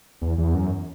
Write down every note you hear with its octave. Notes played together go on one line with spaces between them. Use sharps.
E2
E2
F#2